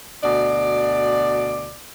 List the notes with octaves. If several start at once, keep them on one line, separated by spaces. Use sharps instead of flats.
D2 B2 D5